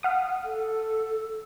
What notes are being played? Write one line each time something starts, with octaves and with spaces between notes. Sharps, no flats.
F5 F#5 D#6
A4